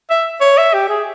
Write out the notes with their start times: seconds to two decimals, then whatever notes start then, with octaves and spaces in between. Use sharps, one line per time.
0.10 E5
0.41 C#5
0.58 E5
0.74 G4
0.89 G#4